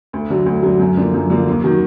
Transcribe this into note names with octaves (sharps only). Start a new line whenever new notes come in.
D2
D3 F#3
D2
D3 F#3
F#2
D3 F3 A#3
F#2
D3 F3 A#3
D#2
D#3 F#3